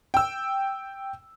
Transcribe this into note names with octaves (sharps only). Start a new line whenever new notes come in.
G5 E6